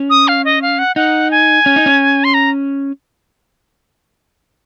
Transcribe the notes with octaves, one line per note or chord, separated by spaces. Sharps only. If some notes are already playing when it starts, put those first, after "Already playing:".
Already playing: C#4
D#6
F5
D#5
F5
F#5
D#4 F#5
G#5
C#4
D#4
C#4
C6
A#5